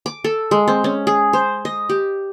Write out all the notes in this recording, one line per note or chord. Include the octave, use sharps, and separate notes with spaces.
D6
A4
G#3
C4
C#4
G#4
C5
D#5
G4